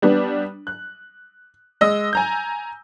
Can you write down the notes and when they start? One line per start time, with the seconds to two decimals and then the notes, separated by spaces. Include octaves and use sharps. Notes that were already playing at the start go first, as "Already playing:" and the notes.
0.02 G3 B3 D4
0.67 F#6
1.81 G#3 D#5 E6 A#6
2.13 G#5 A#5 G6